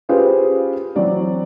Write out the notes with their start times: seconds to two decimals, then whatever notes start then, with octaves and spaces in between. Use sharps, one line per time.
0.09 C#4 F4 G4 G#4 B4 C5
0.96 E3 F#3 C4 D5